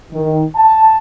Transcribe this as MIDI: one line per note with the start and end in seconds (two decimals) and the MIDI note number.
0.13 0.43 51
0.56 0.96 81